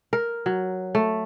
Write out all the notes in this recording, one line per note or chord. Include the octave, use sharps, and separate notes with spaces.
A#4
F#3
A3